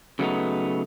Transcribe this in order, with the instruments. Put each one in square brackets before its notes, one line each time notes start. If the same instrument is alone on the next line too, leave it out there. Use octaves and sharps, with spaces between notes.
[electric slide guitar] C#3 F#3 A3 B3 D#4